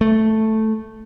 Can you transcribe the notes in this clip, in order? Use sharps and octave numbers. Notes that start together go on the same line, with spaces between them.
A3